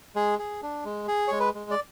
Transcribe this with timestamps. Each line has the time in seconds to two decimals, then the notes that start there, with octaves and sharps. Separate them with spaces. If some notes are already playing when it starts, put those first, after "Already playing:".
0.15 G#3 G#4
0.39 G#4
0.62 D4
0.85 G#3
1.08 G#4
1.28 G#3 C#5
1.40 B4
1.55 G#3
1.71 D5